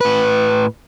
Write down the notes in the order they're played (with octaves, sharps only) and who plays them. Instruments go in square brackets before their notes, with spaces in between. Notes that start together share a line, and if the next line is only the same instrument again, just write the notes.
[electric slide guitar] A2 B4